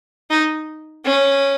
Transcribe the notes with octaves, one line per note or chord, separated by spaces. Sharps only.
D#4
C#4